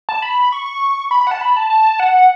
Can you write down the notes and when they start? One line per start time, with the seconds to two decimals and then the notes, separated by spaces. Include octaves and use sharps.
0.09 A5
0.22 B5
0.52 C#6
1.11 B5
1.21 B5
1.27 F#5
1.31 A5
1.41 B5
1.56 A5
1.70 A5
2.00 F#5